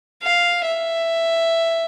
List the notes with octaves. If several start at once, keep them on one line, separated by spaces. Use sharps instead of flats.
F5
E5